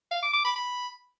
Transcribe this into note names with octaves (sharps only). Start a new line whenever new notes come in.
F5
D6
D6
B5
B5